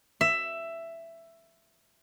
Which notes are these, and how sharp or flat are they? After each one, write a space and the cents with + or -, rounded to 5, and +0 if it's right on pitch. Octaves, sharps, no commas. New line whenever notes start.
E5 +10